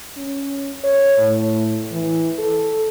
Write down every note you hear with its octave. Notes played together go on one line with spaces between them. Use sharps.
C#4
C#5
A2
E3
A4